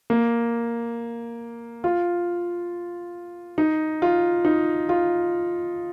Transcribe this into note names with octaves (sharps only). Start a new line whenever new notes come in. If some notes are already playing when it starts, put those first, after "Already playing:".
A#3
F4
D#4
F4
D#4
F4